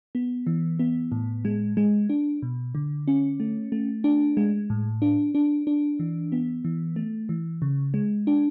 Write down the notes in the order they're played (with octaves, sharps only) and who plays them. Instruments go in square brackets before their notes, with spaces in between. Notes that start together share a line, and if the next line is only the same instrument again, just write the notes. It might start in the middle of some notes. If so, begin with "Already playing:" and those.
[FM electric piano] B3
E3
B3
A2
G#3
G#3
D4
B2
D3
C#4
A3
A3
D4
G#3
A2
D4
D4
D4
E3
B3
E3
A3
E3
C#3
G#3
D4